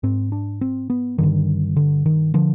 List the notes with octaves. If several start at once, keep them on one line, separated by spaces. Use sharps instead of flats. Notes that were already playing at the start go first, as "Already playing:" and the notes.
G#2 C4
D4
C4
B3
G2 D3 D#3
D3
D#3
D3 F3